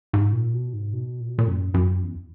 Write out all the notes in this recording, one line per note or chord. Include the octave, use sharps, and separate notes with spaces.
G#2
A#2
B2
G#2
B2
A#2
B2
A#2
F#2
F#2
E2